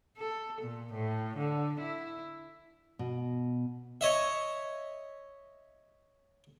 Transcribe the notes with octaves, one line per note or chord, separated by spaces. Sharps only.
A4
A#2
A2
D3
E4
B2
C#5 D#5 E5